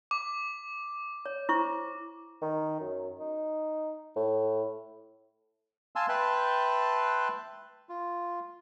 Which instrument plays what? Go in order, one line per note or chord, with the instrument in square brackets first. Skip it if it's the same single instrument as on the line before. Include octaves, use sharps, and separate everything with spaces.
[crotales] D6
[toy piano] C#5
E4 C5 C#6
[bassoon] D#3
F#2
D#4
A2
[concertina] F5 G#5 A5 C6 E6
B4 E5 G5 A5 C6 F#6
F4